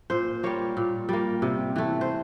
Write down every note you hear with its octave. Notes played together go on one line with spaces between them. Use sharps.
A#2 C5
G3 A#3 C#5
A#2
G3 A#3
C3
E3 A3
C5